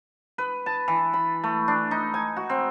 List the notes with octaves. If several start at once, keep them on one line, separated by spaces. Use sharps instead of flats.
B4
A5
E3
B5
A3
D4
D#4
G#5
F#4
C4